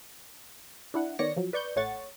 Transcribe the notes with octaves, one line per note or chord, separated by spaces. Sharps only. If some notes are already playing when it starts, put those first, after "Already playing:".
D4 E4 F#5
D#3 B3 C#5 D5 A#6 C#7
F3 F#3
B4 D5 C#6 G6
A1 A3 C#5 F#5 C#6 A6